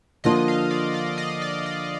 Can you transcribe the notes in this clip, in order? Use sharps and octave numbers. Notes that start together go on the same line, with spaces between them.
D3 F3 A#3 D4 F4 D#5
F5
D5
D5
D#5
D5
D#5